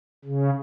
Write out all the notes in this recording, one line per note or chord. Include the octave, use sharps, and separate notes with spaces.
C#3